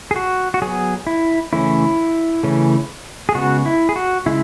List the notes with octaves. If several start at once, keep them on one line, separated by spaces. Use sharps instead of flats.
G#4
F#4
F#4
F#3 B3 G#4
E4
C#3 E3 A3 C#4 E4
C#3 E3 A3 C#4
G#4
C#3 G#3 B3 F#4
E4
G#4
F#4
C#3 G#3 E4